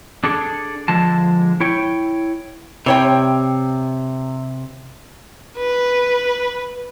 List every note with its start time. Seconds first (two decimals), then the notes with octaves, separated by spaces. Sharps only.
0.24 D4 G#4 A4 D5
0.88 D3 F3 G#3 A5
1.60 E4 C#5 G5
2.86 C3 G3 C#5 G5
5.57 B4